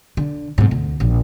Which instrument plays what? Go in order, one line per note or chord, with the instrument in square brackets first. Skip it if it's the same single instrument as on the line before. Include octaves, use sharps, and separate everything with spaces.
[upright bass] D3
G#2 C3
D2
A#1